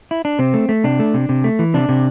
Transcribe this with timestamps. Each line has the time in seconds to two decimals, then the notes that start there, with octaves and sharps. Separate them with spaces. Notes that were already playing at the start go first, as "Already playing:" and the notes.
0.11 E4
0.25 D4
0.39 C3 C4
0.54 A3
0.69 A3
0.84 C3 D4
0.99 A3
1.14 C3
1.29 C3
1.44 A3
1.59 E3
1.74 C3 D4
1.89 C3